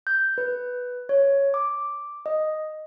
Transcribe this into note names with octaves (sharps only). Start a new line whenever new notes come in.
G6
B4
C#5
D6
D#5